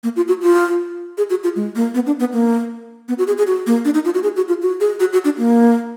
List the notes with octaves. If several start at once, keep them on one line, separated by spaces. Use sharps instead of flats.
A#3
F4
F#4
F4
G#4
F#4
F4
G#3
A#3
B3
D4
B3
A#3
B3
F#4
G#4
G#4
F#4
A#3
D4
D#4
F4
F#4
G#4
F#4
F4
F#4
G#4
F#4
F#4
D4
A#3